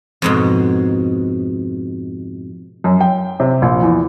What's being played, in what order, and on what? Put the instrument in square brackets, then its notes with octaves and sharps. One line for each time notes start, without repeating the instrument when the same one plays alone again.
[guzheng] F2 G#2 B2
[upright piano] F#2
G5
C3
A#1
E2